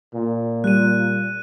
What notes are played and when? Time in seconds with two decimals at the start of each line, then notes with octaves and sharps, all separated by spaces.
0.14 A#2
0.64 G3 F#6 D#7